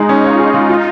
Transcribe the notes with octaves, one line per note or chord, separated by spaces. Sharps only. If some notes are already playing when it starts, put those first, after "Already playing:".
Already playing: G#3 D#4 G#4
C#4
F4 C#5
G#4
G#3
F4